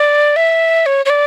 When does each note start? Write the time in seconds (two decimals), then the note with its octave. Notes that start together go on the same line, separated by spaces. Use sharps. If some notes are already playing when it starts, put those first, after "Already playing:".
Already playing: D5
0.36 E5
0.86 C#5
1.06 C#5
1.10 D5